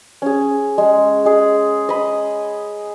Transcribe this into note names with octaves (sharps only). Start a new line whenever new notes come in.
C#4 G#4
G#3
G#3 G#4
D#5 B5